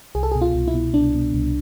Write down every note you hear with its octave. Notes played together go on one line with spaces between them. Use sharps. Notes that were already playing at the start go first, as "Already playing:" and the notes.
C2 G#4
A4
B2 G#4
F4
C2
E4
B2
C2 D4
B2
C2